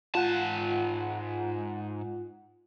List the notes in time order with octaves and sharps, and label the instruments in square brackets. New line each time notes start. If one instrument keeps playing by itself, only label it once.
[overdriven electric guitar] G#2 A5 [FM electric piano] F4 F#5